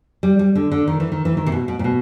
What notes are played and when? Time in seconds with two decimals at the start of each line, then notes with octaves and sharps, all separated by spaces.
0.23 G3
0.39 G3
0.55 D3
0.72 D3
0.87 D#3
1.00 E3
1.12 D#3
1.25 E3
1.37 D#3
1.46 C3
1.52 B2
1.68 B2
1.79 A#2
1.84 B2